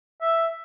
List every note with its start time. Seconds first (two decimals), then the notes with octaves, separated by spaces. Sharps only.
0.21 E5